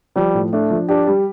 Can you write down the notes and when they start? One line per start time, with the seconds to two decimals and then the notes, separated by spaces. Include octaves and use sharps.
0.16 F3 G3
0.34 A2
0.53 A3 D4
0.71 F3
0.88 D4 G4
1.07 G3